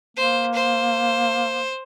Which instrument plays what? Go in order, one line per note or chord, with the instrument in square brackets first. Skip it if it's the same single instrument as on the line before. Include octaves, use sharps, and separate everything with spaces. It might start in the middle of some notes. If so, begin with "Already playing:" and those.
[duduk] A#3 [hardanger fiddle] C5
[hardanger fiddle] C5